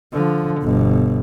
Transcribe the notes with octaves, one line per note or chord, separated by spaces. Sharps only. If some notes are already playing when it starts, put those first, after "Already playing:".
D3 F3
G1 B2